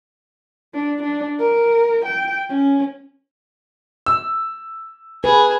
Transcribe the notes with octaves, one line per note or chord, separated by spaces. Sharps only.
D4
D4
A#4
G5
C#4
E6
G#4 B4